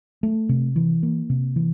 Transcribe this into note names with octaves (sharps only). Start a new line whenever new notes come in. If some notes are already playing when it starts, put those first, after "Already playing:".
A3
C3
E3
A#3
C3
E3